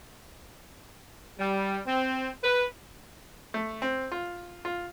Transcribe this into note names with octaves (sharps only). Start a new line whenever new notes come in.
G3
C4
B4
A3
C4
F4
F4